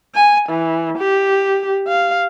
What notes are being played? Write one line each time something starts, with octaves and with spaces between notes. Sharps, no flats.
G#5
E3
G4
F5